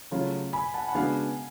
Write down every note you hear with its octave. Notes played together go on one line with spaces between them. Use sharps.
C#3 F#3 A3 C#4 F4
G#5 B5
F#5 A5
F#5
C#3 G#3 B3 D4 F#4 F5 G#5